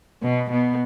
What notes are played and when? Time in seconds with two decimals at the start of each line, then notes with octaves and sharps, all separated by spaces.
0.22 B2 B3
0.50 B2 B3